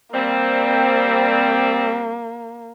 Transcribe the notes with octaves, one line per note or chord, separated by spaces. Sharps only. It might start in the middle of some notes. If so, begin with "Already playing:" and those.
G3 A#3 C4